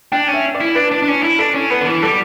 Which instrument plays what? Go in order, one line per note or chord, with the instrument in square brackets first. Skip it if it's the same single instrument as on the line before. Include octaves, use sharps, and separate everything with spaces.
[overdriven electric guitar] D4 [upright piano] G5
[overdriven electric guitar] C#4
[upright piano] E5
D5
[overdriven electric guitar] E4
[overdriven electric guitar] D4 [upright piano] B4
[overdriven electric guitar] D4
D4
C#4
E4
[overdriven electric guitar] D4 [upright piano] A4
[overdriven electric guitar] C#4
[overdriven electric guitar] B3 [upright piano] B4
[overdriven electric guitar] D3
E3
[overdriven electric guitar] G3 [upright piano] A4